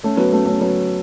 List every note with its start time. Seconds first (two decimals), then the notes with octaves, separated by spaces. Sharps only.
0.04 A3 C#4
0.17 F#3 B3
0.32 A3 C#4
0.46 A3 C#4
0.61 F#3 B3